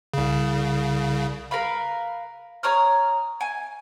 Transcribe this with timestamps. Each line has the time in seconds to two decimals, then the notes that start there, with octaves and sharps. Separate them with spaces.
0.14 C2 C#3
1.51 A#4 B4 F5 B5
2.63 C#5 A#5 D#6 F6
3.41 G#5